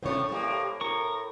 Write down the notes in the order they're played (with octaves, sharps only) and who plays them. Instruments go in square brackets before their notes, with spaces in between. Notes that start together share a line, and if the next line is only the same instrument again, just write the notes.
[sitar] A2 C3 A3 [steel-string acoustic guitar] C5 C#5
[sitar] A2 G3 A#3
[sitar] A2 [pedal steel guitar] A#4 C#6